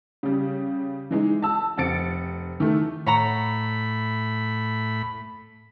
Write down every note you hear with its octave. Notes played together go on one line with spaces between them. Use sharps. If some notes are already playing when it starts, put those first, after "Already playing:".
C#3 G3
E3 G#3 D#4
A5 E6
F1 C4 A6 C#7 D7
D#3 E3 A3
A2 C#5 F#5 A#5 B5